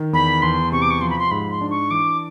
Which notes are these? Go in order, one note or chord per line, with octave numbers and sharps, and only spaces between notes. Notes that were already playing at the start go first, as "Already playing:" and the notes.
Already playing: D#3
E2 B5
E2 C6
C3 C#6
D6
C#6
F3 C6
B5
C6
G#2 B5
C6
D4
C#6
E3 D6